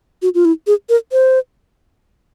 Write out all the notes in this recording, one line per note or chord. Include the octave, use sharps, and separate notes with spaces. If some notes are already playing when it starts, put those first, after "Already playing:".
F#4
F4
E4
G#4
A#4
C5